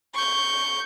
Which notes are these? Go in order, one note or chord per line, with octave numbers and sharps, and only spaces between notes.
C#6 G6